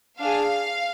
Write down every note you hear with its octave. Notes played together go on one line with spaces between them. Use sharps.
D4 G#4 F5